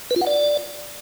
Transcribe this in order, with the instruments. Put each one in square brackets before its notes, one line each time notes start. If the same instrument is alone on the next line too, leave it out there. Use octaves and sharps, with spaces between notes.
[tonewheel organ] B4
F4
F#5
D5